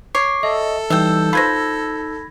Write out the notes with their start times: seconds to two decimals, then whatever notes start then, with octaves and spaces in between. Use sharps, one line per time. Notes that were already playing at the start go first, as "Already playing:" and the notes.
0.15 C#5 D6 C7
0.43 A4 D#5 E5
0.90 E3 G3 D#4 E5 G5 E6 G6
1.33 F4 B4 C5 B5 G#6 A#6